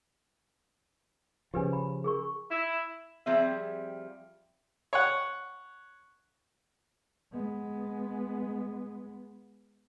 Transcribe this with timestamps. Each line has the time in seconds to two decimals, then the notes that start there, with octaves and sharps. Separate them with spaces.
1.54 C#3 F3 G4 B4 G#5
1.73 B5
2.04 G#4 A#4 C#6
2.51 E4
3.26 F3 G3 C4 G#4 E5
4.93 C#5 F#5
7.32 G#3 B3